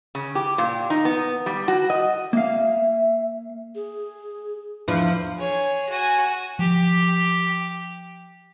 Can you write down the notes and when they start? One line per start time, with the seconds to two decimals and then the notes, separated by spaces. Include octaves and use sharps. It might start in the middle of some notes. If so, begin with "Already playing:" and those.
0.15 C#3
0.35 G4
0.58 A#2
0.90 D#4
1.05 B3
1.46 G3
1.68 F#4
1.90 D#5
2.33 A#3 E5 F5
3.75 G#4
4.88 E2 F3 D4
5.39 G#4 C#5
5.90 F#4 G#5
6.59 F3 G4